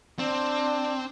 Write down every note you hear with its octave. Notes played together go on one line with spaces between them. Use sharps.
C4 D4